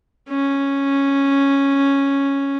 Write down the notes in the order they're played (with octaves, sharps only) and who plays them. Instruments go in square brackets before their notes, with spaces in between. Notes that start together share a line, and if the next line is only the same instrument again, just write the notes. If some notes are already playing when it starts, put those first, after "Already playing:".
[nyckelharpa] C#4